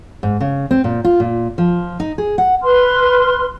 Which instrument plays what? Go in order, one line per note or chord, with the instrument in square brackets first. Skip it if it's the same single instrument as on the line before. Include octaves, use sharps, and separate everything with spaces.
[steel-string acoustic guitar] G#2
C#3
C4
A#2
F4
A#2
F3
D#4
G#4
F#5
[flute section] B4 C6 F6